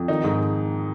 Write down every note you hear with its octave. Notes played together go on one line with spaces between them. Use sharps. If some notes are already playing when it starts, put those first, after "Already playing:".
Already playing: F2
D#3 D#4
G#2